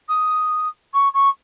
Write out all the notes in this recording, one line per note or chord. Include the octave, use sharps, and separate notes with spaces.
D#6
C#6
C#6